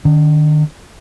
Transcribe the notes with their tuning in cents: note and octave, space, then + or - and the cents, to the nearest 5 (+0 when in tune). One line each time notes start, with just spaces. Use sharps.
D#3 -40 C#4 +40